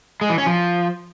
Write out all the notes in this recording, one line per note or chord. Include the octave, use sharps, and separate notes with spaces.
G#3
E3
C#4
F3